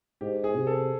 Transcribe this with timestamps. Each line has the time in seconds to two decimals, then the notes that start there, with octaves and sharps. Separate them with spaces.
0.21 G#2 G4
0.44 G#4
0.55 C3
0.67 A4